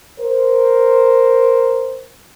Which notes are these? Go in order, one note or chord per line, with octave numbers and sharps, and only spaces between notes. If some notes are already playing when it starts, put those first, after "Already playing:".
A#4 C5